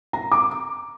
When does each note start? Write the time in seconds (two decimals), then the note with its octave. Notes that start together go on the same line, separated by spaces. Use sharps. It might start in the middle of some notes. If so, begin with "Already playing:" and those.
0.13 A#5
0.32 D6